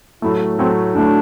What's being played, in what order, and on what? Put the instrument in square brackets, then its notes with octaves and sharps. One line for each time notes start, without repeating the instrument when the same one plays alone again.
[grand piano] A2 F#3 A3 [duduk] E4
[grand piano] A2 F#3 A3 [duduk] C4
[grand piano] A2 F#3 A3 [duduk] D4